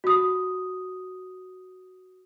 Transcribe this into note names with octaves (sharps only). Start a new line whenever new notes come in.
F#4 D#6